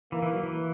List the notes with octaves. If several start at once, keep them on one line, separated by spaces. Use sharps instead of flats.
E3 A#3
E3
F#3
E3